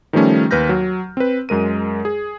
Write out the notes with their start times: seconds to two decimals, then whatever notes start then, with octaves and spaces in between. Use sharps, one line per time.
0.13 D#3 F3 G3 A3 C#4
0.51 D#2 B4 F6 G6 A#6
0.69 F#3
1.17 C4 B4
1.49 F#2 G#3 A#4 D#7
2.05 G#4